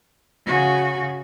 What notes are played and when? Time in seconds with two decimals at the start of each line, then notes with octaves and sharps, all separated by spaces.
0.46 C#3 F#4